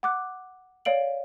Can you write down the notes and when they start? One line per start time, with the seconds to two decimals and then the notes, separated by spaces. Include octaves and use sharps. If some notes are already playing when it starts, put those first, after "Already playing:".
0.03 F#5 D6 F#6
0.85 C#5 D5 F5 D7 F#7